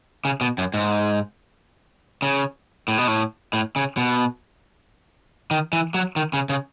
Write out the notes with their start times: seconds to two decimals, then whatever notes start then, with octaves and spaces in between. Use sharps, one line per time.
0.25 C#3
0.41 B2
0.58 F#2
0.74 G#2
2.22 C#3
2.88 A2
2.98 B2
3.08 A2
3.53 A2
3.76 C#3
3.97 B2
5.51 D#3
5.73 E3
5.94 F#3
6.16 D#3
6.33 C#3
6.49 C#3